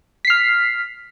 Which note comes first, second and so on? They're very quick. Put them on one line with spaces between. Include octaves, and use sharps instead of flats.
B6 C7 F6